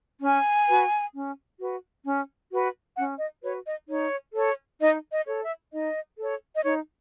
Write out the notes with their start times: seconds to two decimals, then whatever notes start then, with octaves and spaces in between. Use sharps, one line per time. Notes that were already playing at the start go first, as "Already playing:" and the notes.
0.22 C#4 G#5
0.67 F#4 B4
1.14 C#4
1.60 F#4 B4
2.05 C#4
2.51 F#4 B4
2.96 C#4 F#5
3.19 D#5
3.43 F#4 B4 C#5
3.66 D#5
3.88 D#4 C#5
4.34 A4 C#5
4.79 D#4 D#5
5.10 D#5
5.26 A4 C#5
5.41 E5
5.71 D#4 D#5
6.17 A4 C#5
6.54 D#5
6.63 D#4 C#5